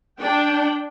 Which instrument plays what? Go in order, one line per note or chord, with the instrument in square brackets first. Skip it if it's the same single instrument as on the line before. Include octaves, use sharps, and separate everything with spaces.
[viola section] D4 G5